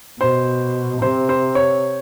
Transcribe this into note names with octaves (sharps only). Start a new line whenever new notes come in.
B2 C5
C3 C5
C5
C#5